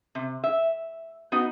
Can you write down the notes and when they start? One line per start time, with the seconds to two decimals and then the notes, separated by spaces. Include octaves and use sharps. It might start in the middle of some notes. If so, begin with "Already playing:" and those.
0.15 C3
0.44 E5
1.32 B3 D#4 F#4